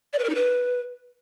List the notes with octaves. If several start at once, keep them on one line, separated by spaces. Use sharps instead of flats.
D5
B4
A#4
D#4
B4